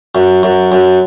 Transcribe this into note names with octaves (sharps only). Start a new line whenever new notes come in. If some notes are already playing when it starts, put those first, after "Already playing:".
F#2
F#2
F#2